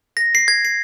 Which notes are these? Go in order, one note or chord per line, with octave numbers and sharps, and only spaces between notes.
A#6
C7
G#6
C7